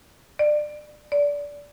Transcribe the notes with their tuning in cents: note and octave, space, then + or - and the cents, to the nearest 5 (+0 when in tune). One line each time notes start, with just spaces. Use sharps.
D5 +25
D5 -20